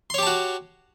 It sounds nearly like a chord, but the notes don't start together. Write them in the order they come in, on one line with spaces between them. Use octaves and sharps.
C6 C#5 G4 A5 F#4